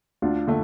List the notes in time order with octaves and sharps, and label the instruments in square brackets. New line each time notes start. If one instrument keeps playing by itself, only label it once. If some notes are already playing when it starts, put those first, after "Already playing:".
[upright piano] D2 [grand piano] D4 F4
[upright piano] D3 A3